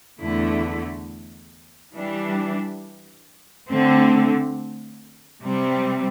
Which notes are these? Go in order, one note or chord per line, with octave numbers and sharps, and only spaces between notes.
E2 D3 A3 E4
E3 G3 D4
D3 A3 C4
C3 G3 C4